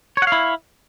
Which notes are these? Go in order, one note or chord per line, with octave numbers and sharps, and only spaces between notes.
E4 C#5 F5 F#5